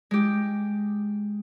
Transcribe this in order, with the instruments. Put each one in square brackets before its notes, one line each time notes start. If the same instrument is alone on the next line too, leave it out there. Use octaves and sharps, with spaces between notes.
[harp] G#3 G4